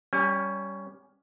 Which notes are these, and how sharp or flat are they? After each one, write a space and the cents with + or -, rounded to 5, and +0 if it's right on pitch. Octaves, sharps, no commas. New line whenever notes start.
G3 +0 C#4 +10 G#5 -45